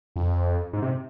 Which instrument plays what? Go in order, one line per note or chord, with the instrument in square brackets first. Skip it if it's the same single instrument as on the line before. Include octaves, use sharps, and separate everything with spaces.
[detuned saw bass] F2
G#2
C3